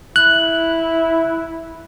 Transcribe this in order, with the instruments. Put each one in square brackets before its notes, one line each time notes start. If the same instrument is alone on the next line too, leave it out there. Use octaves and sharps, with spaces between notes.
[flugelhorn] E4 [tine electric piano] F#6